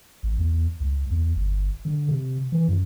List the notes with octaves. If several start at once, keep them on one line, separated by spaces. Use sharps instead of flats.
A1
E2
C#2
E2
G1
D3
C3
E3
F#2